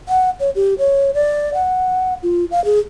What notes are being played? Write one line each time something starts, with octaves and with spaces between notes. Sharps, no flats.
F#5
C#5
G4
C#5
D5
F#5
F4
F5
G#4